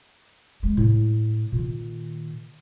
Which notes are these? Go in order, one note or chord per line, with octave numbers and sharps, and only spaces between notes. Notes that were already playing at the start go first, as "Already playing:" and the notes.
G#3
A2
A#2 D#3